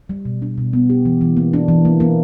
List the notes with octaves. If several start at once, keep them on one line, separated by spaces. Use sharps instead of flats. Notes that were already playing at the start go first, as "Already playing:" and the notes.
G3
B2
D4
B2
B3
G4
E3
E3
A#3
D4
E3
A#3
A#3